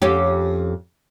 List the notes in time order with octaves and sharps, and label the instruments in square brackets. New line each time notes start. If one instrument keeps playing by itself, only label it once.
[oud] F2 C#4 G4